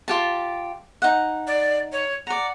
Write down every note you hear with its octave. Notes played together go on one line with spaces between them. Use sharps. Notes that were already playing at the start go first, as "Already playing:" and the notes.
F4 G4 A5
D#4 F#5
D5
C#5
D5 F#5 A#5